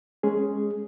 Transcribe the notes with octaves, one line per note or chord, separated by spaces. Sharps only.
G#3 C#4 G#4